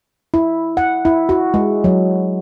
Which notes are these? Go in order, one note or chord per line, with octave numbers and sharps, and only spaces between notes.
E4
F#5
E4
F#4
G#3
F#3